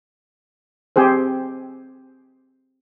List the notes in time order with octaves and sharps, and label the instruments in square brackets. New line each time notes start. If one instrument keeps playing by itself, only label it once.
[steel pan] C4 G4 G#4 C5